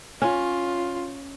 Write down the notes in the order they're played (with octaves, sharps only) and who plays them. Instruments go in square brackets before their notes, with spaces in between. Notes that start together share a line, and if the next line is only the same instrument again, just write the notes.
[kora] C#4 [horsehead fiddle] F4